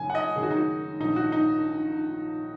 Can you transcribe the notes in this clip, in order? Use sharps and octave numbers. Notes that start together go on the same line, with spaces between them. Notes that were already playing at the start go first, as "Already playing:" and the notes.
Already playing: F#1 F#2 C#3 G#5
F#5
D#5
F#1 F#2 D#3 G#4
F#4
D#4
F#4
A#1 G#2 D#3 D#4
F#4
D#4